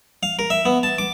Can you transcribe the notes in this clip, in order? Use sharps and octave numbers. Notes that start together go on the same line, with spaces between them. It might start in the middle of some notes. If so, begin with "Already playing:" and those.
F5
A#4
E5
B3
A5
D6